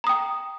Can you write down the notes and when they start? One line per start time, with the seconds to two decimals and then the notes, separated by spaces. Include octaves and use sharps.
0.04 A#5
0.07 D#6
0.09 G5